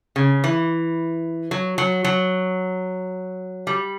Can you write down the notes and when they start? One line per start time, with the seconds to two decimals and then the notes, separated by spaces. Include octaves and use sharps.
0.16 C#3
0.44 E3
1.51 F#3
1.78 F#3
2.05 F#3
3.67 G3